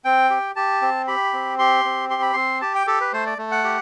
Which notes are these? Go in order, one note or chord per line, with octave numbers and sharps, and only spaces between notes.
C4 G5
G4
G4 A5
C4
G4 B5
C4
G4 C6
C4
G4 C6
B5
C4 C6
G4 A5
G5
G4 A4
B4
A3 C5
D5
A3
F#5
G4